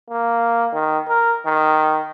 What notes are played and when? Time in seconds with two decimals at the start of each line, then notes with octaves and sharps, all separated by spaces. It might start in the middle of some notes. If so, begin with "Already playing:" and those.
0.10 A#3
0.73 D#3
1.08 A#4
1.46 D#3